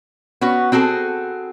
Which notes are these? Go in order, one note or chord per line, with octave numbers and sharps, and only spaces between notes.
B3 C#4 F#4
C4 F#4 G#4 A4